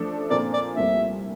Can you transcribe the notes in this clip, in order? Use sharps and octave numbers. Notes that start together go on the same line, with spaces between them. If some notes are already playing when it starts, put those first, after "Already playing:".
Already playing: F3 A3 D4 A4
A#2 F3 C4 F4 A#4 D5
D5
C2 A#2 A3 C4 E4 E5